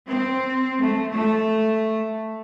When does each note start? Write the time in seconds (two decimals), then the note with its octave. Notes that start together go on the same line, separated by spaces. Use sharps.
0.11 C4
0.81 A3
1.11 A3